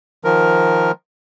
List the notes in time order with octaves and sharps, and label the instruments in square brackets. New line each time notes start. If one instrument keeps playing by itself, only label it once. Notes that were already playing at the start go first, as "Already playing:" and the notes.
[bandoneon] D#3 F3 A#4